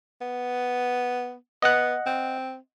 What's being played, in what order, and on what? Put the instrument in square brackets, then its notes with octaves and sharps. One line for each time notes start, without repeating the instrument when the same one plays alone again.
[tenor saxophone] B3
[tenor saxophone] B3 [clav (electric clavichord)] D#5 F#5
[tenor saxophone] C4